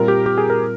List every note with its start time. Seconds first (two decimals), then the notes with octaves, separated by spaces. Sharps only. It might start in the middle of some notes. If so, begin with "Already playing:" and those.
Already playing: A#2 G3 C4 F4 A#4
0.08 G4
0.26 G4
0.38 G#4
0.50 A#4